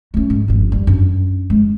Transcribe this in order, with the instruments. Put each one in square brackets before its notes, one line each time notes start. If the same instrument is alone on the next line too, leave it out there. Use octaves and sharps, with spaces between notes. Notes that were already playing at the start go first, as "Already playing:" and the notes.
[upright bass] A3 C#4
G#2
G1 F2
G3
F#2 D4
G#3